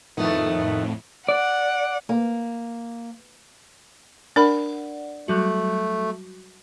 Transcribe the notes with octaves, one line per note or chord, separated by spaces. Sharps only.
F2 A2 D#3 A3 B3
D5 F#5
A#3
D4 A#4 D5 F#5 B5
F#3 G3 A3 F#4